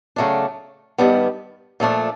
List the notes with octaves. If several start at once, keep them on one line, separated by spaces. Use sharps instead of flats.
C#3 F#3 A3 D4
G2 D#3 G3 B3 D4
A#2 F3 A3 D4